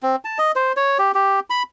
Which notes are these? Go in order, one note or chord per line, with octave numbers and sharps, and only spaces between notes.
C4
A5
D#5
C5
C#5
G4
G4
B5